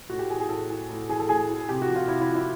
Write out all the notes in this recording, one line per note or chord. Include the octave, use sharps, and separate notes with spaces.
A2 F#4
G4
E3 G#4
G#4
A2 A4
E3
A2
E3 G#4
A4
A2 G#4
E3
C3 G4
F#4
F3
F4
C3 E4
E4
F3
E4